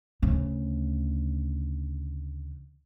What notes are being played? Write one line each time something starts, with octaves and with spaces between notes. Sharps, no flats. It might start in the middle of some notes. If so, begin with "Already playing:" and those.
D2 C#3